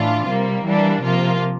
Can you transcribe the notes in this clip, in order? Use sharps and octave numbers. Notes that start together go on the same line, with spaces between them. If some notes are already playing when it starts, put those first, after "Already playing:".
Already playing: A2 E3 D4 F4
C3 G3 A#3
E3 G3 A#3 D4
C3 F3 A#3 F4